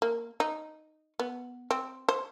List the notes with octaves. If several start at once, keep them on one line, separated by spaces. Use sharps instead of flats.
A#3
D#4
B3
C4
C5